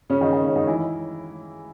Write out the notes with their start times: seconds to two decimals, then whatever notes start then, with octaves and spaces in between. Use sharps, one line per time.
0.10 C#3 C#4
0.21 D#3 D#4
0.33 D#3 D#4
0.44 C#3 C#4
0.56 D#3 D#4
0.67 E3 E4